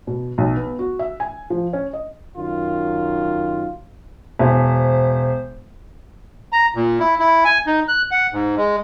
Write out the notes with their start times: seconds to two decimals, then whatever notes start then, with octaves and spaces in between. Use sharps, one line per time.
0.07 B2
0.38 B1
0.57 B3
0.79 F#4
0.99 E5
1.20 G#5
1.50 F3
1.73 C#4
1.93 D#5
2.37 F#2 D#3 F4
4.39 E1 C5
6.53 A#5
6.75 A#2
7.00 E4
7.19 E4
7.45 G#5
7.67 D#4
7.88 F#6
8.11 F#5
8.33 G#2
8.57 G#3